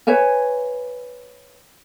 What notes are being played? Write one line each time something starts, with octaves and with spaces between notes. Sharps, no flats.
B4 C#5 E5 G#5